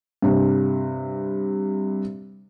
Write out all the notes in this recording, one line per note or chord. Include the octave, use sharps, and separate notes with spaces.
G2 C3